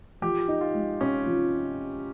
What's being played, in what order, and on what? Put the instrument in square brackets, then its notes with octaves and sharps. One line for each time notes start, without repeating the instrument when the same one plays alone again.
[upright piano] F3 [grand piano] G4
[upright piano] D#4
[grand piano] F4
[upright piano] G#3
[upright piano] C3 [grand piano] C#4
[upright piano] F3